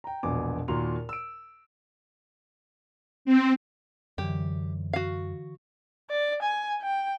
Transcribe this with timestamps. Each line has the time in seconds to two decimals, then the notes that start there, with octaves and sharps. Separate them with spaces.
0.04 G5 A#5
0.23 E1 A#1 B2 G#5 D6
0.68 D#2 A#2 F#4 A#5 C6 F7
1.09 E6 D7
3.25 C4
4.18 F#2 D3 E3 G4
4.93 F#4 F5
6.10 D5
6.42 G#5
6.82 G5